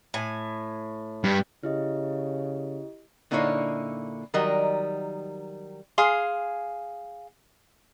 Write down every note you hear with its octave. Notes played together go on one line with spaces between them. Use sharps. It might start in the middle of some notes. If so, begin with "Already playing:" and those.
A2 G#5
G2 G3
C#3 E4 G4 D#5
A#2 D3 A#3 D#4 E4 C#5
D#3 F#3 G3 A#4 D#5
G#4 F5 C6